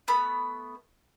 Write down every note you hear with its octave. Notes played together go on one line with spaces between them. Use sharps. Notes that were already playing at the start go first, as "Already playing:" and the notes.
A3 B3 B5